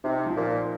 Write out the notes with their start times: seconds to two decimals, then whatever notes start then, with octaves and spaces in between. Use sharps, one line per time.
0.04 C3 D#4
0.26 F3
0.36 A#2
0.48 A#3